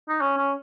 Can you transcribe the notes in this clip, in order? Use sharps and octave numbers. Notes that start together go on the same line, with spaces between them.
D#4
C#4
C#4